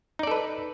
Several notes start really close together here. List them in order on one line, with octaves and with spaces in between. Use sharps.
D#4 D5 A4 B4